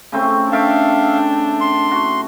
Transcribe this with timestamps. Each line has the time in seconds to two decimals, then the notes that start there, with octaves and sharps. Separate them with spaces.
0.12 C#3 A3 C4
0.52 D4 A4 E5 F5 G5
1.61 C6
1.91 F#4